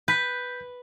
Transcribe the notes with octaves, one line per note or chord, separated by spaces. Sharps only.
B4 G6 B6